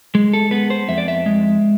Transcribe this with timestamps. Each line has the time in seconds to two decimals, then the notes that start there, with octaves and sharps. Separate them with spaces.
0.15 G#3
0.33 A4
0.51 B3 B4
0.70 C5
0.88 F2 E5
0.98 D5
1.08 E5
1.26 G#3